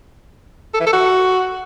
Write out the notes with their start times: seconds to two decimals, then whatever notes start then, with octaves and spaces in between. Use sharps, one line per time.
0.74 A4
0.80 E3
0.86 A4
0.93 F#4